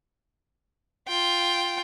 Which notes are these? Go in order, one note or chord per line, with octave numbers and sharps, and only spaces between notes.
F4 G5